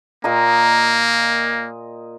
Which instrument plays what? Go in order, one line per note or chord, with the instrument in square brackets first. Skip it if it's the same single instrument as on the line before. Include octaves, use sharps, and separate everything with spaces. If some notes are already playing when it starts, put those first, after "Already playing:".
[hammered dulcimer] A#2 D#5 A#5 [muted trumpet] A#3